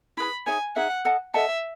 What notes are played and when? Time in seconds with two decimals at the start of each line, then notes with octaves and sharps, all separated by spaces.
0.17 E4 G#4 B4 B5
0.46 D#4 G#4 C#5 E5 G#5
0.76 D#4 G#4 C#5 E5 F#5
1.05 A4 D#5 F#5 A5
1.34 A4 D#5 E5 F#5 A5